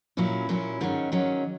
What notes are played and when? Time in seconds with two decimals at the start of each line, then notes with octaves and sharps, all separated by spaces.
0.17 A#2 F#3 C#4 E4
0.49 A#2 F#3 C#4 E4
0.81 G#2 D#3 F#3 C#4
1.12 G#2 D#3 F#3 C#4